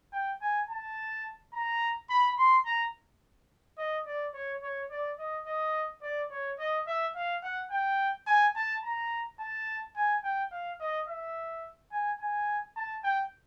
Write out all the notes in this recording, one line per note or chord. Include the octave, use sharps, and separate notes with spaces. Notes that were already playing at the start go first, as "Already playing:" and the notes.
G5
G#5
A5
A#5
B5
C6
A#5
D#5
D5
C#5
C#5
D5
D#5
D#5
D5
C#5
D#5
E5
F5
F#5
G5
G#5
A5
A#5
A5
G#5
G5
F5
D#5
E5
G#5
G#5
A5
G5